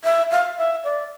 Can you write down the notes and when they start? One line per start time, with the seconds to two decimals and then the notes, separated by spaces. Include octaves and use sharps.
0.04 E5
0.31 F5
0.57 E5
0.84 D5